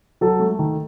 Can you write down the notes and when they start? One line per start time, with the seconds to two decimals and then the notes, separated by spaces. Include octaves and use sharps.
0.21 F#3 A4
0.40 A3
0.59 D#3